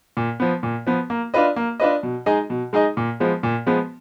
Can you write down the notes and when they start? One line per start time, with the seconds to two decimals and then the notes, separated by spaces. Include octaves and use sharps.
0.17 A#2
0.40 F3 B3
0.63 A#2
0.86 F3 B3
1.10 A#3
1.34 D4 F4 B4 D#5
1.56 A#3
1.80 D4 F4 B4 D#5
2.03 B2
2.26 G#3 D#4 G#4 D#5
2.50 B2
2.73 G#3 D#4 G#4 D#5
2.97 A#2
3.20 F3 G#3 B3
3.43 A#2
3.67 F3 G#3 B3